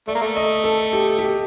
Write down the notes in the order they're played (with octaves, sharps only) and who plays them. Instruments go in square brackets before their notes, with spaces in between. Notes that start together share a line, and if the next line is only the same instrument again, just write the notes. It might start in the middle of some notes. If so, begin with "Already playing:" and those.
[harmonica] A3 [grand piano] D5
[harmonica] A#3
A3
[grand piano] D#5
A4
G4
G4